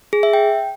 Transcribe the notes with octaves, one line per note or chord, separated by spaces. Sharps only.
G#4
E5
G5